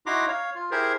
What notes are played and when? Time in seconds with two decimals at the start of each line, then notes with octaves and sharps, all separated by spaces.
0.06 D#4 E4 F#4 A#5 C6 D6
0.28 C#5 F5
0.55 F4
0.71 E4 G4 G#4 A#4 C5